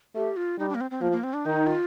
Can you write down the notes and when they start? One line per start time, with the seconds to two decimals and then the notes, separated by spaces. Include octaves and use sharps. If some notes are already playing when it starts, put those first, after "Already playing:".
0.15 A3 G4
0.37 F4
0.58 G3 D#4
0.69 D4
0.75 A#3
0.81 C4
0.91 C4
1.01 F3 A#3
1.12 A#3
1.24 C4
1.34 D4
1.45 D#3 D#4
1.67 F4